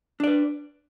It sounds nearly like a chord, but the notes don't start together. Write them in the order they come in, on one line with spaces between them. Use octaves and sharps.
D4 D5 B4